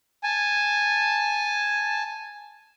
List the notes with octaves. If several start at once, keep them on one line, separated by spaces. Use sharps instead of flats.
G#5 A5